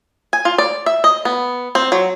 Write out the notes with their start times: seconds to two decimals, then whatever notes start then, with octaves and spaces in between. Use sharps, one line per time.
0.33 G#5
0.45 F4
0.58 D5
0.86 E5
1.04 D#5
1.25 B3
1.75 C4
1.92 F#3